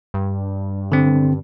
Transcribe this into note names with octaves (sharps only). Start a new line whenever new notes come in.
G2
D3 C4